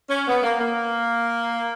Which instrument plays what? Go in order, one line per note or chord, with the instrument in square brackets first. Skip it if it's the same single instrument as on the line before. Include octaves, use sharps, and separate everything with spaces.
[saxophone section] C#4
B3
A#3
A#3